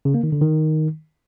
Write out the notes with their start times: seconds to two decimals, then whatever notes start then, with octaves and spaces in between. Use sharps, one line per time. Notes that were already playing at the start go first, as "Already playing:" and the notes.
0.05 C#3
0.14 A#3
0.23 D#3
0.32 D3
0.41 D#3